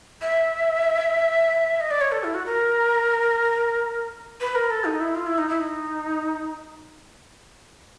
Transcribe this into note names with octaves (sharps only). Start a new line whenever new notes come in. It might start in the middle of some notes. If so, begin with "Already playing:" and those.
E5
D#5
D5
C#5
A4
E4
F#4
A#4
B4
A#4
A4
D#4
E4
F4
E4
D#4
E4
D#4